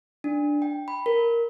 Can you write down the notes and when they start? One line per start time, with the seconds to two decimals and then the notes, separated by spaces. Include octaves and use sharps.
0.24 D4
0.62 G5
0.88 B5
1.06 A#4